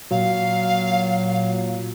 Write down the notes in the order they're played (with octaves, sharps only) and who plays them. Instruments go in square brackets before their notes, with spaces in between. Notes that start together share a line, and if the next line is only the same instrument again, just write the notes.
[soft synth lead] A#2 [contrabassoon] F#3 [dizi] F5